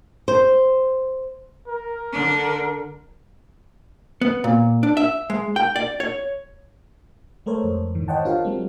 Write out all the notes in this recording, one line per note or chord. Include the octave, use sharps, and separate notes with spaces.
C5
A#4
D3 D4
B3
A#2
D4
E5
G#3
G5
D5
C#5
G#3 A3 A4 A#4 C5 C#5
F2
G#2 D#3 E3
C5 C#5 D#5 F#5 G5 A5
D4 F4 G4 A#4 F5
F#3 G#3 C4